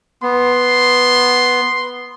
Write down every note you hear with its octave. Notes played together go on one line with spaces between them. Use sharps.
B3 C6